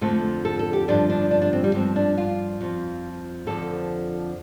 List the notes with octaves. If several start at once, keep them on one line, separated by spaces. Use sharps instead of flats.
F2 D3 F3 A3
A4
A4
G4
G2 D3 F3 D4
D4
D4
D4
C4
G3
G2 F3 C4
D4
F4
F2 F3
F2 D3 F3 A4